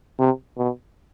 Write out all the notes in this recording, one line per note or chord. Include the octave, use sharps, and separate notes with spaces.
C3
B2